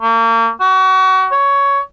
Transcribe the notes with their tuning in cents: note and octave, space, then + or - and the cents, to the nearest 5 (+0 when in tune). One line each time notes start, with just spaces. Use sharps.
A#3 -35
F#4 +30
C#5 +15